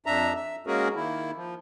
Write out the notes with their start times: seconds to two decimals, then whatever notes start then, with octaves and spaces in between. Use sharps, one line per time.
0.06 F2 D4 E5 A#5
0.36 E5
0.67 G#3 A#3 C#4 F#4 G#4 A#4
0.96 D#3 A#3 E4
1.36 F3